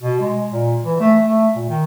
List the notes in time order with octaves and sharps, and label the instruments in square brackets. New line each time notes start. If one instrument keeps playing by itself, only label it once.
[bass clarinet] B2
G#3
A#2
E3
A3
A3
A#2
D#3